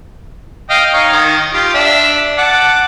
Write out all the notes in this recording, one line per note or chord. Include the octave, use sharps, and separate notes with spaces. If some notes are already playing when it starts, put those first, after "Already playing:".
D#5 F5 G5
D#4 C#5 F5
D#3
F4 G4
D4 E5
F#5 A5 D6